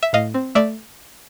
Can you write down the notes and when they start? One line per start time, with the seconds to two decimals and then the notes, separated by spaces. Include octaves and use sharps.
0.03 E5
0.13 A2 D#5 F5
0.34 C4
0.55 A3 D5 E5